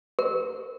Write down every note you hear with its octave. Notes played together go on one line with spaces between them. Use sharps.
A#4